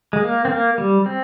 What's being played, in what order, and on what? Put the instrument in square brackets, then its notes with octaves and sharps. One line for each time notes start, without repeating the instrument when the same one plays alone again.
[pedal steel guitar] G#3
A#3
C4
A#3
G3
C4